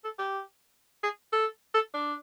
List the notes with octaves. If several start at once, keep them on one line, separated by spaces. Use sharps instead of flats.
A4
G4
G#4
A4
A4
D4